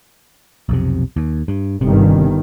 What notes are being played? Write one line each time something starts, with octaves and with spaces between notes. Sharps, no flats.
B1 F2 C3
D#2
G2
G1 G2 C3 D#3